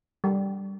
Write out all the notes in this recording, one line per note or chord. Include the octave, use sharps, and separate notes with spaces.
G3